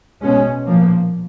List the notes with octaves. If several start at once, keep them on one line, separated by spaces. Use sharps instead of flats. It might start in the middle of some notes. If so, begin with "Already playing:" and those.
B2 G#3 C#4
A#2 F3 A#3